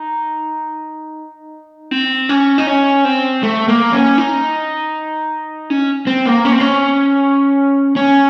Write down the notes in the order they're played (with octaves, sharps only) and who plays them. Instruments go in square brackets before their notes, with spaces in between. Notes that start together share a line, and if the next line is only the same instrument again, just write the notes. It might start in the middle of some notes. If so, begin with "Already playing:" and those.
Already playing: [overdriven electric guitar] D#4
C4
C#4
D#4
C#4
C4
A3
A#3
C#4
D#4
C#4
C4
A#3
C#4
C4
C#4
C#4